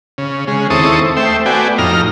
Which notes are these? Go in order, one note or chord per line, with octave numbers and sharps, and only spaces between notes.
C#3
C#3 G#3
D#2 C4 E4 A4 C#6 D#6
A3 C5 E5 G5
A3 B3 F#4 D5 G5 G#5
F2 A2 D#4 A#5 F6